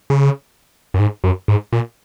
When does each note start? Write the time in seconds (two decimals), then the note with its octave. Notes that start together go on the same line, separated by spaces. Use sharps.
0.10 C#3
0.94 F#2
0.99 G#2
1.24 F#2
1.48 G#2
1.72 A#2